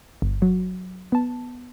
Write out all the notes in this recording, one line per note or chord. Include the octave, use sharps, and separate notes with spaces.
G1
F#3
B3 A5